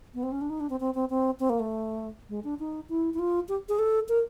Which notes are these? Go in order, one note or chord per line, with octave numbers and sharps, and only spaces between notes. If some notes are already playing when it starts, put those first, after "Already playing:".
B3
C4
C#4
D4
D#4
D4
C4
C4
C4
C4
C4
A#3
A3
G#3
D4
D#4
E4
E4
F4
G4
G#4
A4
A#4